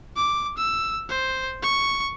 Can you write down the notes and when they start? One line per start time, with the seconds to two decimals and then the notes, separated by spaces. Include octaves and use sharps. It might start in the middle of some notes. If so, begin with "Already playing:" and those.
0.17 D6
0.58 E6
1.09 C5
1.63 C#6